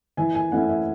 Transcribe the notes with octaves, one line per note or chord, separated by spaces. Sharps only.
E3 G#5
G#5
A3 C#4 E4 F#5
E5